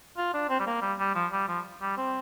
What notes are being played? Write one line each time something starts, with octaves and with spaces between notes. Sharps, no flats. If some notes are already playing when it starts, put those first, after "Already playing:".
F4
D4
C4
G3
A#3
G3
G3
F3
G3
F3
G3
C4